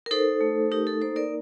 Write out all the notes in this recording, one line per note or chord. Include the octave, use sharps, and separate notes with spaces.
A#4
D#4 A4 C5
A3
D#4 G4 A#4
A4
A#3 A4 C5
A#4 D5